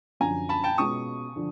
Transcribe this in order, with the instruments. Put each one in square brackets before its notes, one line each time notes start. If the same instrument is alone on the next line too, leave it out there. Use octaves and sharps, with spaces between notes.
[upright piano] F#2 D3 F3 [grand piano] G#5 A#5
[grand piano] A5 B5
G5 A5
[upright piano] B2 G#3 C#4 F4 [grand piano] C#6 D#6
[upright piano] D3 F3